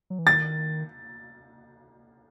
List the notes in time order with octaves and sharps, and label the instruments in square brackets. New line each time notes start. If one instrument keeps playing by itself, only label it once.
[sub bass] F#3
E3
[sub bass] D#3 [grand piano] A6